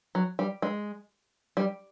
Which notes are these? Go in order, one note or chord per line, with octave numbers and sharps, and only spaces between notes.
F#3
G3
G#3
G3